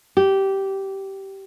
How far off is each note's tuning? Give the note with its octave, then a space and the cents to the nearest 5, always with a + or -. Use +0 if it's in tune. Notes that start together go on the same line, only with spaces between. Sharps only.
G4 -15